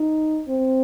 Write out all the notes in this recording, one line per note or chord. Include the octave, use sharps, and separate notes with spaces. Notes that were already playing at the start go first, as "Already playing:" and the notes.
Already playing: D#4
C4